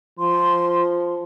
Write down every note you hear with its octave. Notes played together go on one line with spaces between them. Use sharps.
F3 C6